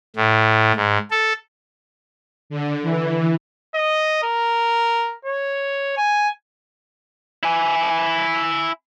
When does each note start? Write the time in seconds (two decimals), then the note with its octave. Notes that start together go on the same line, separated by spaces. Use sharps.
0.16 A2
0.76 G#2
1.11 A4
2.50 D3
2.83 E3
3.75 D#5
4.23 A#4
5.25 C#5
5.97 G#5
7.43 E4 G#5